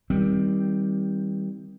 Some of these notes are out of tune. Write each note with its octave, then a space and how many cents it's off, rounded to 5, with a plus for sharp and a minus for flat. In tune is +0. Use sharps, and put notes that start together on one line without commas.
D#3 +30 G3 +0 C4 +0